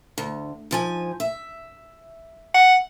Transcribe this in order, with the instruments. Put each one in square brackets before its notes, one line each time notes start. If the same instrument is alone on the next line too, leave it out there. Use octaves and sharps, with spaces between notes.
[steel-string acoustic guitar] D2
G#2 F3 G#5
E5
[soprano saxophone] F#5